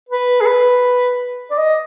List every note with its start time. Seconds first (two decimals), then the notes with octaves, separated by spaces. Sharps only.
0.09 B4
0.41 G#4
0.46 B4
1.51 D5
1.58 D#5